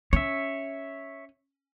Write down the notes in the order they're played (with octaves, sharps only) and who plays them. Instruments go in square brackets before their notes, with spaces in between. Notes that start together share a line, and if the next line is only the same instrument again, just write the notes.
[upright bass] C#4 [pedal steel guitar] C#5 E5